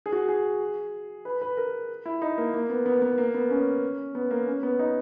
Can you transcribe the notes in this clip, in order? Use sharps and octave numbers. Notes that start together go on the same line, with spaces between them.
G#4
F#4
G#4
B4
B4
A#4
E4
D#4
A#3
A#3
B3
B3
B3
A#3
B3
C#4
B3
A#3
C#4
B3
D#4